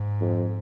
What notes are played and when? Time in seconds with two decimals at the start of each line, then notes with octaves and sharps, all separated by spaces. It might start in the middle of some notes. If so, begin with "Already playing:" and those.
Already playing: G#2
0.21 F2